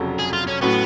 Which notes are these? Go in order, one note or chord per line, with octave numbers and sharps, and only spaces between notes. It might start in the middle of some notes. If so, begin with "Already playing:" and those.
Already playing: F1 F2 C#3 F#3
G#4
F4
C#4
A2 F#3 B3 C#4 F#4